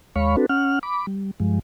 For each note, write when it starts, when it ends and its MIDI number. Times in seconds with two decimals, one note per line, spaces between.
0.16 0.36 39
0.16 0.36 56
0.16 0.36 73
0.16 0.36 77
0.16 0.36 83
0.16 0.36 85
0.37 0.46 60
0.37 0.46 62
0.37 0.46 66
0.37 0.46 69
0.37 0.46 71
0.49 0.79 61
0.49 0.79 78
0.49 0.79 89
0.83 1.06 83
0.83 1.06 86
1.07 1.31 55
1.40 1.59 43
1.40 1.59 53
1.40 1.59 56